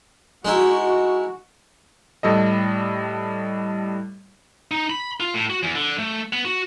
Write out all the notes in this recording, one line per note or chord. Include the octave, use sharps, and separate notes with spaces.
G#3 D#4 E4 F#4
A2 G3 A4 D#5
D#4
B5
F4
A2
F#4
E2
D3
A3
B3
F#4